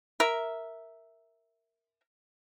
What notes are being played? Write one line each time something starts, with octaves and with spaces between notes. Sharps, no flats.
A#4 E5